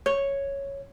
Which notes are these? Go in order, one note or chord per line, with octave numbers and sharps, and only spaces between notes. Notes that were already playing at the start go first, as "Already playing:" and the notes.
C#5